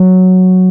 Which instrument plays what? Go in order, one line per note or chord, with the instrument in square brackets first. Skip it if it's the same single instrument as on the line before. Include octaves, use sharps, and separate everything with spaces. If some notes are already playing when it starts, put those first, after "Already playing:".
Already playing: [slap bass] F#3